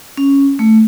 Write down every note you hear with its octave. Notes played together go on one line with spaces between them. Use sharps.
C#4
A3